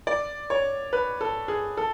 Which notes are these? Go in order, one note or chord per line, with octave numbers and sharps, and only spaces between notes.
D5
C#5
B4
A4
G#4
A4